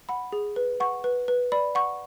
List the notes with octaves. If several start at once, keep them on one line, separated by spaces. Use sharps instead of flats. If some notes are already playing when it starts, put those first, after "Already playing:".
F#5 B5
G#4
B4
F#5 C#6
B4
B4
D5 B5
F#5 C#6